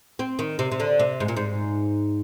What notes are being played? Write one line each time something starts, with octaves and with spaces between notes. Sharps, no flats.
C4
D#3
C3
C3
D3
C3
G#2
A#2
G#2